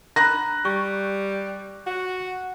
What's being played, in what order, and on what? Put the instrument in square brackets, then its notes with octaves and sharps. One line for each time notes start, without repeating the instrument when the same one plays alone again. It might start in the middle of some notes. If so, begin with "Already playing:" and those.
[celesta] A#5 B5 [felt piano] F#6 A#6
[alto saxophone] G3 [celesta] C#6
[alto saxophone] F#4